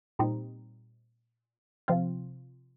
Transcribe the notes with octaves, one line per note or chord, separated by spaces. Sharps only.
A#2 G3 C4 D#4
C3 F3 C4 F4